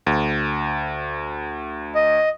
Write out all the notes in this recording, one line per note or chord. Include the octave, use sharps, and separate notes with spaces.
D2
D#5